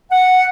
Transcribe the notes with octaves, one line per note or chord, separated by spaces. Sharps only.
F#5